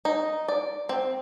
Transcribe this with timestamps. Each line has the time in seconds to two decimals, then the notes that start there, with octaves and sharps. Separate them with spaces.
0.05 D#4
0.48 D5
0.89 C4